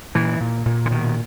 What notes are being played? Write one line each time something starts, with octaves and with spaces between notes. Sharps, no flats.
A#2 E3
A#2
A#2
D3
B2 D#3